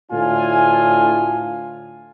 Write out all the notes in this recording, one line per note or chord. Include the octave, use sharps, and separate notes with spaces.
D2 A2 D4 F4 G#5